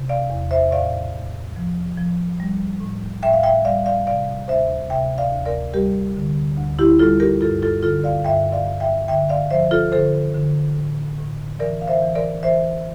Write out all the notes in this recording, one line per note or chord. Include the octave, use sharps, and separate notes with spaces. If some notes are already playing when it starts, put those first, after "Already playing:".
Already playing: C3
D5 F5
E2
C5 E5
A2 D5 F5
A2
F3
F3
G3
A2
A2 E5 G5
F5
E5 G5
G3 D5 F5
D5 F5
C3 D5 F5
D2 C5 E5
C3 E5 G5
D5 F5
D2
A#4 D5
G3 G4 A#4
D3
D2
E4 G4
G3 F4 A4
G4 A#4
G2 F4 A4
F4 A4
D3 F4 A4
D5 F5
G2 E5 G5
D5 F5
G2
E5 G5
D3 E5 G5
D5 F5
F3 C5 E5
F4 A4
D3 A4 C5
D3
A2
A2
E3 A#4 D5
F5
C5 E5
E3
A#4 D5
E3 C5 E5